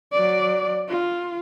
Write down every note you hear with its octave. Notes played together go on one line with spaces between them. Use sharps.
F#3 D5
F4